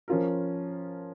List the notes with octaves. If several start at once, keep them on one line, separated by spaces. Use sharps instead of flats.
F3 C#4 F4 A#4